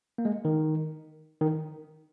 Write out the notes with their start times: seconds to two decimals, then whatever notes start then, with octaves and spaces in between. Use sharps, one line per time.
0.18 A#3
0.25 G#3
0.45 D#3
1.41 D#3